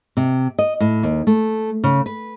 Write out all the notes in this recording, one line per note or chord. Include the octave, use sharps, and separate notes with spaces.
C3
D#5
A2
D#2
A3
C#3
B4